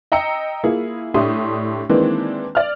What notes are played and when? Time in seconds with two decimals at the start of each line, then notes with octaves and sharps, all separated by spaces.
0.12 D#5 G5 A#5 E6 C#7
0.64 A#3 E4 F4 G#4
1.14 A2 D4 G4 E5 C6 D#6
1.89 D#3 E3 G#3 A#3 C4 D4
2.55 D5 F6